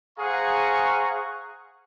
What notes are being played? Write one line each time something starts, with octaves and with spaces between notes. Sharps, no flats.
G#4 C5 F5 F#5 A#5 C#6